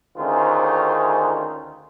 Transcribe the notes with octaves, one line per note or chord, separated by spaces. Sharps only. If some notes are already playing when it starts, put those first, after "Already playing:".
D2 D#3 C#4 F4 G#4 C5